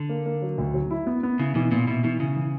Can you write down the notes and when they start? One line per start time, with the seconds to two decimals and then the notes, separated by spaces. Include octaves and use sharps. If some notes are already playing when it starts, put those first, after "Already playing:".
Already playing: D3
0.09 A#3
0.26 A#3
0.42 F#3
0.58 D2
0.74 F#3
0.91 E4
1.07 B3
1.23 B3
1.39 C#3 E4
1.55 B2 E3
1.71 A#2 B3
1.87 B2 E4
2.04 B2 E3
2.20 C#3 E4
2.36 E3